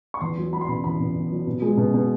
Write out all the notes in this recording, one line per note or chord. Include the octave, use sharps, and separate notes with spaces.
C#6
E2 C6
F#3
F#3 B5
C6
B2 B5
E2 B5
B2
E2
F#3
B2
G#3
B2
B2